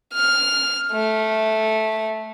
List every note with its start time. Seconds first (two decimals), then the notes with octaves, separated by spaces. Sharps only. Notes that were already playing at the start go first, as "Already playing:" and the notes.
0.14 F6
0.92 A3